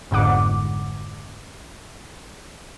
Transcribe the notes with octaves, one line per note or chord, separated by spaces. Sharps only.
G1 F2 G#2 D3 F#5 D6